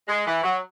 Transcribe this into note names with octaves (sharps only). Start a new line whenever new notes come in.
G#3
E3
F#3